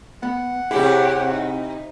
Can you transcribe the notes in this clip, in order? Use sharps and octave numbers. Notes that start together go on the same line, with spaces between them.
B3 F#5
C3 E4 G4 G#4 C#5 E5
D#4